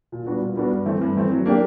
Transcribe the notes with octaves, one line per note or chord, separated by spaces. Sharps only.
A#2
G3 B3 D4 F#4
A#2
G3 B3 D4 F#4
G2
E3 A3 C4
G2
E3 A3 C4
F#3
A#3 D4 G4